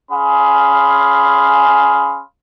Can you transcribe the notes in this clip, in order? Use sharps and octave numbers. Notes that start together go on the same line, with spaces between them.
C#4 G#4 F5 B5 C6